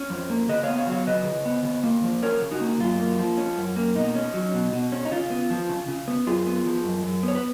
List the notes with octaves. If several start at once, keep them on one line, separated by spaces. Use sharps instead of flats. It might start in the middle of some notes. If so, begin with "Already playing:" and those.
Already playing: C#4
F2
A#3
C#3 B4 D#5
B3 C#5 F5
C#5 F5
F#3
C#5 F5
C#3 B4 D#5
C#3
B3
C#3
A#3
F3
C#4 A#4 C#5
C#3
D#4 F#4
A#3
F#2 F4
A#3
F3
C#4
F#2
A#3
B2 D#4
C#4
F#3
B2
B2
C#4
D#4
C#3 F4
B3
F3
C#3
C#3
B3
F#2 F4 G#4
B3
F3
F#2
F#2
B3 C#5
B4